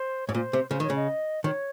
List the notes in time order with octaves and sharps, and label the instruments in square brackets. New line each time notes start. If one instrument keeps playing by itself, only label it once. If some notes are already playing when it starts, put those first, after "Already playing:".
Already playing: [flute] C5
[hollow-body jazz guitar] G#2 [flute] C#5
[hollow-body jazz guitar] A#2 [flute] C5
[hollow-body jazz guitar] C3
[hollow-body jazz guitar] C#3 [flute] C5
[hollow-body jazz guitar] D#3 [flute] C#5
[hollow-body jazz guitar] C#3
[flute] D#5
[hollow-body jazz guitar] D#3 [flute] C#5